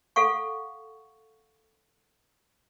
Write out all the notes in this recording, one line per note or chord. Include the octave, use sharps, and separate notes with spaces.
A4 F5 F#5 C#6